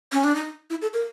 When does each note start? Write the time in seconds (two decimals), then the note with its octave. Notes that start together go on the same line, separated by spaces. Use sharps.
0.12 C#4
0.24 D4
0.35 D#4
0.70 E4
0.82 A4
0.93 A#4